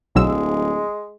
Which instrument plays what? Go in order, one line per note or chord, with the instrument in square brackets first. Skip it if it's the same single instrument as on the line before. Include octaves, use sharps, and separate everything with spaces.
[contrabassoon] D1 [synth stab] B1 F#3 E6 [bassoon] G#3